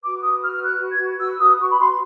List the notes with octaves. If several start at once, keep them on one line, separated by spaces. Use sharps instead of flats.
F#4 B4 D6
D#6
F6
F6
F#6
G#6
E6
D#6
C#6
B5
C6